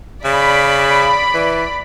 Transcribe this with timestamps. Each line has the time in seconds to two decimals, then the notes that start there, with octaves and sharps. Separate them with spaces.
0.25 C#3 D5 B5
1.34 E3